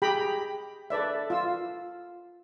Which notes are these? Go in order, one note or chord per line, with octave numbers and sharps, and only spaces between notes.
G4 G#4 G5 A#5 B5
A4 B4 D5 E5
F4 E6